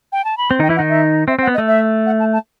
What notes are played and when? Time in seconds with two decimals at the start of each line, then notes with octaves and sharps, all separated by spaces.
0.12 G5
0.25 A5
0.38 B5
0.50 C4 C6
0.59 D#3 D#4 G5
0.69 E3 E4
0.76 D#3 D#4 F#5
0.89 E5
1.28 C4 E5
1.39 C4 F#5
1.47 B3
1.54 D#5
1.58 A3
1.67 E5
2.06 F#5
2.20 A5
2.33 A5